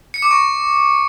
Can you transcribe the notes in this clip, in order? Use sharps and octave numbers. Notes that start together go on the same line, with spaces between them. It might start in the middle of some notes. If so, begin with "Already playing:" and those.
C#7
D6
C#6